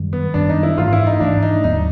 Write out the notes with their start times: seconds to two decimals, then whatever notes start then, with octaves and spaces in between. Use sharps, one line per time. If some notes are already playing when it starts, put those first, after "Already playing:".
Already playing: F#2 D#3 G3
0.13 B3
0.34 F#2 D#3 G3 D4
0.49 D#4
0.63 E4
0.78 G#2 E3 A3 F4
0.93 E4
1.07 D#4
1.20 G#2 E3 A3 D4
1.42 D#4
1.64 D#2 D3 F#3 B3 D#4